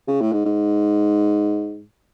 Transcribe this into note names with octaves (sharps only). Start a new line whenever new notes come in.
C#3
A2
G#2
G#2